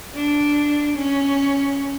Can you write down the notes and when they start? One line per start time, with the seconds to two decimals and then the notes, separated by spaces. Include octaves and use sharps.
0.15 D4
0.97 C#4